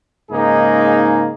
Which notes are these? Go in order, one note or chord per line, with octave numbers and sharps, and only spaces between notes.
G#2 C#3 G#3 A#3 D#4 G#4